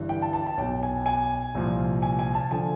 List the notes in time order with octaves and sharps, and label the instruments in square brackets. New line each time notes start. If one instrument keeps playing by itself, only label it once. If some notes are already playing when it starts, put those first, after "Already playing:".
Already playing: [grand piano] G1 G2 E3
G5
A5
A5
A5
B1 B2 G5
G#5
G#5
C2 A#2 F3
G#5
G#5
A5
D3 F3 G#5